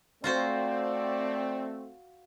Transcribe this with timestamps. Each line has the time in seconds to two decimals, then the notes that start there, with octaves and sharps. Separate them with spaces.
0.24 A3 C4 F4 F#4 C5 D5